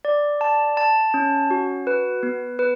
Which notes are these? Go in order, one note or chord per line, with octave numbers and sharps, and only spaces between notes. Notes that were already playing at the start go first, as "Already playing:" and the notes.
D5
A5
A5
C#4
F#4
B4
B3
B4